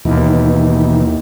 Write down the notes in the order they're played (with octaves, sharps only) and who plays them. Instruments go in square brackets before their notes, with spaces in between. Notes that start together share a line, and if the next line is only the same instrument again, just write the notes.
[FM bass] D#2 [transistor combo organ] B2 D#3 E3